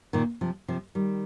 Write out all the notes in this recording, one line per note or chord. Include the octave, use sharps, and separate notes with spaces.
A#2 D#3
C3 F3
C3 F3
D#3 G3